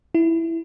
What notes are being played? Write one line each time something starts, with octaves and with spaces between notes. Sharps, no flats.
E4